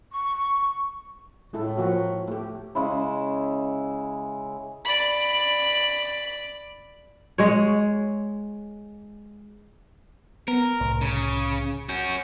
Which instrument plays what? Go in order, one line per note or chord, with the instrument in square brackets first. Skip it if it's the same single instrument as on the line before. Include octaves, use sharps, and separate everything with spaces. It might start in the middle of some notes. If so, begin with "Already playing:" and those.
[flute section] C#6
[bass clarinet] A2 [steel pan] G#3 E4 A4
[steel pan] F3 A#3 F#4
A3 G4
[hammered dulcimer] C#3 G#3 E4
[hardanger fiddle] D5 B5
[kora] G#3 C#5
[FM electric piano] B3 [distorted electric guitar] A#4
[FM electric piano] C2 A2
[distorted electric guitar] C#3
[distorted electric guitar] C#4 F#4 [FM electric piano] G6